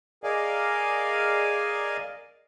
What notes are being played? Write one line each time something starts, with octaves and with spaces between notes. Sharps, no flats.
G#4 A#4 D5 D#5 F5 G#5